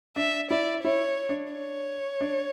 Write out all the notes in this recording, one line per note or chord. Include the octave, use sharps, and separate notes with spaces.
D4 E5
E4 D5
E4 C#5
D4
C#5
D4